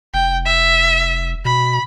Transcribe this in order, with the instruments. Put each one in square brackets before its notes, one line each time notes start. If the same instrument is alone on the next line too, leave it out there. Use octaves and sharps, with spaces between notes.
[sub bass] F1 [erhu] G5
[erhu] E5
[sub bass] B2 [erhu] B5